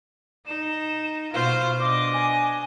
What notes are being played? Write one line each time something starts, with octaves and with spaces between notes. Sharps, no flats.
D#4 E7
B2 F4 C5 F5
B2 D4 D#5 D6
G#5